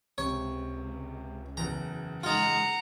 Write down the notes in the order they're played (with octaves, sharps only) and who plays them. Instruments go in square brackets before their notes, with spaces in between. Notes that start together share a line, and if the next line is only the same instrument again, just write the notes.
[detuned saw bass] C#2 [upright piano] C3 [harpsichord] C#5
[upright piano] F#1 E2 [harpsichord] A#5
[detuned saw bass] G#3 [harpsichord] D#4 F4 [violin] F#5 A#5